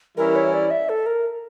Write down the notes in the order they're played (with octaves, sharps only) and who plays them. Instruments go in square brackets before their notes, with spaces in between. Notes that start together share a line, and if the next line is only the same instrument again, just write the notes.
[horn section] E3 G3 C#4 E4 [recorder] A#4
[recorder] C#5
D5
E5
A4
A#4